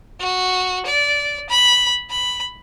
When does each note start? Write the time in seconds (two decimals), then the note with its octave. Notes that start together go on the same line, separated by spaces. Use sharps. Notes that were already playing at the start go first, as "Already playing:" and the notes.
0.20 F#4
0.86 D5
1.49 B5
2.10 B5